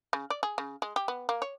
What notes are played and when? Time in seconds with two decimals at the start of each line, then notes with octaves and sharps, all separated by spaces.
0.13 C#3
0.30 D5
0.43 G#4
0.58 C#3
0.82 G#3
0.96 G4
1.08 B3
1.29 A#3
1.42 C#5